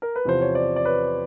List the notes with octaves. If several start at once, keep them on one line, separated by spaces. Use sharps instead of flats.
A#4
B4
E2 C3 F3 C5
C#5
C5 D5
D5
B4 C#5